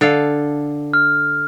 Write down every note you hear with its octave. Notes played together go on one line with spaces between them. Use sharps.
D3 A4 F5
F6